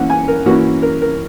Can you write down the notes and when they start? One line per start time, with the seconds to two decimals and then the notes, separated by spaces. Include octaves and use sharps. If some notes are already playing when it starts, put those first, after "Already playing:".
Already playing: E3 A#3 C#4 F#5
0.10 G#5
0.28 A#4
0.46 E3 A#3 C#4 F#4
0.82 A#4
1.02 A#4